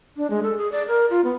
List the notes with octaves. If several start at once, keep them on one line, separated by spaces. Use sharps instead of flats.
D4
G#3
A4
G#4
D5
A#4
F4
B3